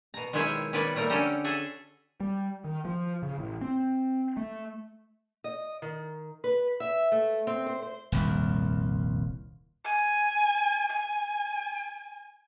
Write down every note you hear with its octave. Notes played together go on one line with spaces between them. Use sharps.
B2 A#5
D#3 F#3 G#3 E4 G4 C#5
D#3 G3 B3 B4 C#5 D5
G3 A3 A#3 A#4
D3 C#4 G4 A4 A#5
F#4 G#4 A4 E5
G3
D#3
F3
C#3
A1
C4
A3
D#5
D#3
B4
E5
A3
C4
C5
C5
D#1 C2 F2
G#5
G#5